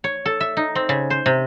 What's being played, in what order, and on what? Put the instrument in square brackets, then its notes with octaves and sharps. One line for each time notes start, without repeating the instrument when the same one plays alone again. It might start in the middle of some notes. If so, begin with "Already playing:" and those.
[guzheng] C#5
A4
E5
D#4
C4
C#3
C5
C3